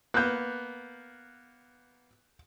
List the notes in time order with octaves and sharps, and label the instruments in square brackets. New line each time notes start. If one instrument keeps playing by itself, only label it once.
[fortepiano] A#3 B3 [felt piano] F#6 G6